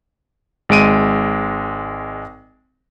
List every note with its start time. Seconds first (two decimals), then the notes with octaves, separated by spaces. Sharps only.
0.69 G#1 G#3 D7 D#7